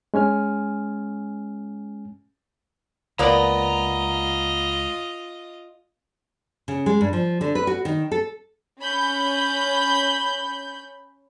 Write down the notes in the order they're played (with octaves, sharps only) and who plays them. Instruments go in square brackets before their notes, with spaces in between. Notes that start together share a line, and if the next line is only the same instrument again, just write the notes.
[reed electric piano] G#3 C#4 G#5 F6
[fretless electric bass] C#2 [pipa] A#3 B3 D5 [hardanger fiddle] F4 D#5 [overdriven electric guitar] A#5
[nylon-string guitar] C#3
G#3
G2
F3
D3
B4
F#4
D#3
A4
[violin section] C#4 B5 G6